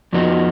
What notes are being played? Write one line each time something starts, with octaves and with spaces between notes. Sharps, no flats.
F2 F3 B3 D#4 F#4